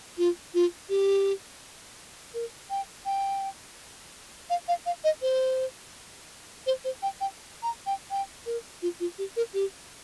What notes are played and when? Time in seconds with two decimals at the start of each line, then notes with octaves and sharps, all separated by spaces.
0.18 F4
0.54 F4
0.89 G4
2.34 A#4
2.70 G5
3.05 G5
4.50 F5
4.68 F5
4.86 F5
5.04 D#5
5.22 C5
6.67 C5
6.84 C5
7.02 G5
7.21 G5
7.63 A#5
7.86 G5
8.11 G5
8.46 A#4
8.82 F4
9.00 F4
9.18 G4
9.36 A#4
9.54 G4